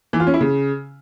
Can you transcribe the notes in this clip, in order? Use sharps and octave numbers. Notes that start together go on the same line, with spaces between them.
E3
F4
C#4
E4
C#3